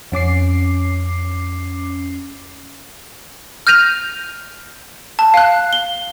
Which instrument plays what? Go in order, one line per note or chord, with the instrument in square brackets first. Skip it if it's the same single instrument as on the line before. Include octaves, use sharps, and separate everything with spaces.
[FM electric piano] F2 C#4 D6 C7
[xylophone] F6 G6 A#6 D#7 F7
A5
F5 F#6
G7